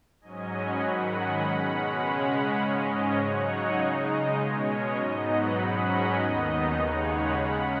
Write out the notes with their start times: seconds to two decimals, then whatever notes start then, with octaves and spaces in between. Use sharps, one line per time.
0.21 G#2 F#3 C#4 D#5 G#5
0.51 F#5 B5
0.81 G#2 D#3 F#3 F#5 B5
1.11 D#5 G#5
1.40 B2 G#3 C#4 F#5 B5
2.00 C#3 G#3 C#4
2.59 G#2 G#3 C#4 D#5
2.89 C#5
3.18 C#3 F#3 D#4 C#5 F#5
3.48 D#5 G#5
3.77 C#3 G#3 D#4 D#5
4.37 B2 G#3 C#4 C#5
4.67 D#5
4.96 G#2 F#3 B3 D#4
5.26 F#5 B5
5.55 G#2 F#3 C#4 F#5 B5
5.85 D#5 G#5
6.15 D#2 D#3 B3 D#4 D#5
6.74 D#2 C#3 G#3 D#4 C#5 F#5
7.04 F#5 B5
7.34 C#3 G#3 C#4